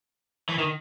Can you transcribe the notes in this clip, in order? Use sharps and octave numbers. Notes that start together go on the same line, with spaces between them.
E3
D#3